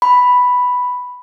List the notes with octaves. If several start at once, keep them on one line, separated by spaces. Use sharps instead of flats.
B5